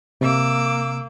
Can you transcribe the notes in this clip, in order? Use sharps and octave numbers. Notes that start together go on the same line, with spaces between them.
C3 A#3 D6 E6